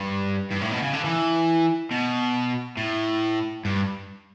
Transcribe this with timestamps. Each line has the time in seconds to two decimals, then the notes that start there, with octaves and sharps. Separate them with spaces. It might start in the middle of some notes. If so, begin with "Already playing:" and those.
Already playing: G2
0.51 G2
0.61 A2
0.72 B2
0.82 C#3
0.93 D3
1.04 E3
1.91 B2
2.77 A2
3.65 G2